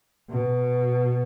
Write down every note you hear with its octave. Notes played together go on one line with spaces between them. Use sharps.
B2